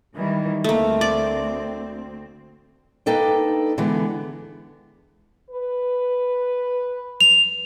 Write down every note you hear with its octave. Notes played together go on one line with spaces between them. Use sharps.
D#3 E3 G3
D2 A3 A#3 C4
D5
A#3 D4 D#4 A4 B4 G5
D3 E3 G#3 B3
B4
F7